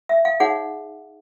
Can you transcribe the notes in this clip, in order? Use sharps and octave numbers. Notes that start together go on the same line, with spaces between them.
E5
F5
D#4 G#4 C#5 F#5